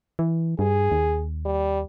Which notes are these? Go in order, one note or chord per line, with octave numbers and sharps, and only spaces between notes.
E3
G2 G#4
D#2
G3